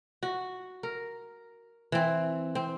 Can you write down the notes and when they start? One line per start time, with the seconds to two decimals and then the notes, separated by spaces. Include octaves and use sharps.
0.23 F#4
0.83 A#4
1.92 E3 C4
2.55 C4